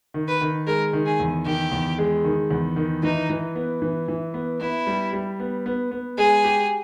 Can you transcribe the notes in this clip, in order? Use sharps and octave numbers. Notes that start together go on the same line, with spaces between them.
D#3
B4
D#3
G#3 A#4
D#3
G#4
E2
D#3 G4
E2
G#3
D#3
E2
D#3
E3 D#4
E3
B3
E3
E3
B3
B3 E4
G3
G3
B3
B3
B3
G#3 G#4
G4